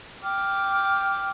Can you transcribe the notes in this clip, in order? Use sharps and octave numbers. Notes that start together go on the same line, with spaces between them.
G5 D6 F6